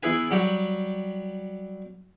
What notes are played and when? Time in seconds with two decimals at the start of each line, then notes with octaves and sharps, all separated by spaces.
0.03 E2 E4 G#4 B4 G#5
0.31 F#3 G3 F#4 G4